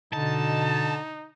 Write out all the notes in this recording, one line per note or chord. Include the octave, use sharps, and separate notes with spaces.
B2 D3 D#4 A5